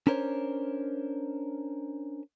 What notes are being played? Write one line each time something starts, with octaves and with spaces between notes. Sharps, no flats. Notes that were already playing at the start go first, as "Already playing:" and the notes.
C#4 D4 A#4 C5 C#5